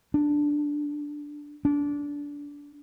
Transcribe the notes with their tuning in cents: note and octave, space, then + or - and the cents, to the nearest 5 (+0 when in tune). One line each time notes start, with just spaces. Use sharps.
D4 +0
D4 -20